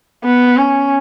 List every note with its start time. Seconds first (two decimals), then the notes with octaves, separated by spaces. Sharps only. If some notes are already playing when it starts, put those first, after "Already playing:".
0.24 B3
0.57 C#4